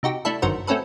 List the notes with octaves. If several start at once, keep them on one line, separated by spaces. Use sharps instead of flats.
C3 D#4 F#4 G4
A3 D4 E4 A4
G1 F#2 D#3 F#4 A#4 C5
A3 C4 C#4 F#4 A4 B4